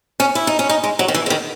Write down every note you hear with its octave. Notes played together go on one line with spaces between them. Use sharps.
C#4
E4
D#4
C#4
D#4
G#3
F#3
D#3
E3
C#3
D#3